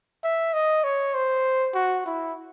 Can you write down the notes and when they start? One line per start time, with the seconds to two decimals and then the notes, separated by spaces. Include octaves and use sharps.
0.24 E5
0.54 D#5
0.84 C#5
1.15 C5
1.75 F#4
2.06 E4